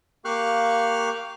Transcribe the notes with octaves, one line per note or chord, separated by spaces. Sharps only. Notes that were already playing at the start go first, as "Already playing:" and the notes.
A#3 G4 F5 C#6 F6 F#6